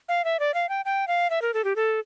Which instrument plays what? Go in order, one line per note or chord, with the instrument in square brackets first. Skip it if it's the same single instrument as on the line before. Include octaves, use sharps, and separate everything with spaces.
[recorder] F5
E5
D5
F5
G5
G5
F5
E5
A#4
A4
G4
A4